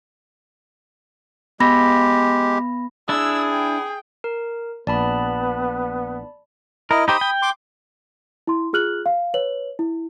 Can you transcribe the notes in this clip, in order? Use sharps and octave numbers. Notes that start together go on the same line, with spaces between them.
G#3 B3 G4 B5 A#6
D4 E4 G#4 E6
G5
A#4
A#1 B3 B4 D5 A5 B5
E4 A#4 D#5
D#4 G4 C5 B5 D#6
G5
C6 D6
E4 C6
F4 G#4 F6 F#6 F#7
F5
B4 C#5 F#7
E4